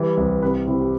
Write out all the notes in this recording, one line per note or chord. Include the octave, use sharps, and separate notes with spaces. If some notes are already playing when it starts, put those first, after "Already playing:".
Already playing: E3 G3
C2
C3 B4
C3 E4
G4